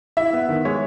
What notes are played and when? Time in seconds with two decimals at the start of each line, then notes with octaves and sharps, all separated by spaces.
0.17 E4 E5
0.33 B3
0.49 D#3
0.65 G#3 C#5